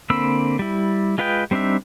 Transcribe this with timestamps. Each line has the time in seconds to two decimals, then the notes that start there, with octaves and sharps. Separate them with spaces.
0.10 D3 A#3 C4 B5 E6
0.59 G3 E4
1.18 G#3 F4 B4 D#5 G5
1.51 G3 C4 D4 D#4 E5